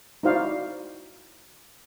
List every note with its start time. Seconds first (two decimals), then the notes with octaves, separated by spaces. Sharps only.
0.23 D#4 E4 F#4 C5 D5 F5